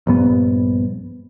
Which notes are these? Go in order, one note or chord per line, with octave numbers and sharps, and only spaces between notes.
A#1 G2 B3